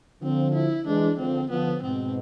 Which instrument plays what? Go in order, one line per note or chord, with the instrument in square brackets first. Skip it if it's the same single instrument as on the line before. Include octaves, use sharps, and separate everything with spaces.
[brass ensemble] D3 F3 [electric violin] C4
[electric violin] E4
[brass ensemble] E3 G#3 [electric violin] D4
[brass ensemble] D3 F3 [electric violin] C4
[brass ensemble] D3 F3 [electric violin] B3
[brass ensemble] G#2 B2 [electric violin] C4